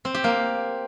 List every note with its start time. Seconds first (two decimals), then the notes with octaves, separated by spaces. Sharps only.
0.05 C4
0.14 G4
0.24 A#3